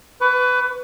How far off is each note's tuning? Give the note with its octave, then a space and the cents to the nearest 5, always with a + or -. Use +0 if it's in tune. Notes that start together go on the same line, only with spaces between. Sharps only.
B4 +20 C#6 +30